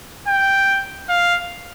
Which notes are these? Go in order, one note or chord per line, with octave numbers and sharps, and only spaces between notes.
G5
F5